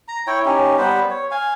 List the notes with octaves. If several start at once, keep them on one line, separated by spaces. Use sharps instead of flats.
A#5
E4 C#5 G5
C#4 D#4 G4
G3 B3 B4 C5
C#5
F5 G#5